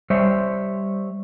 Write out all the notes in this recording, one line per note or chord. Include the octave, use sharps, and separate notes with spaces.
G3 C5 C#5 E5